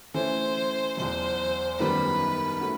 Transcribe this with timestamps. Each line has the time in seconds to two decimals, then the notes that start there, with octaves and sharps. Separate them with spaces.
0.14 E3 A3 C#4 C5
0.97 E2 B2 F#3 C5
1.79 F#2 D#3 G3 B3 B4
2.61 A3 C#4 F#4